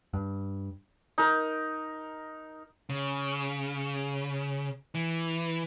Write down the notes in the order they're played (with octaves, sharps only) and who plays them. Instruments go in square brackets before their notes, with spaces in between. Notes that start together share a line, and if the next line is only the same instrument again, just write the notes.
[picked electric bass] G2
[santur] D#4 A#4
[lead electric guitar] C#3
E3